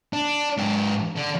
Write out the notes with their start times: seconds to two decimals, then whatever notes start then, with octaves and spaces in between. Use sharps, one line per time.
0.13 D4
0.57 G#2 G4
1.17 D3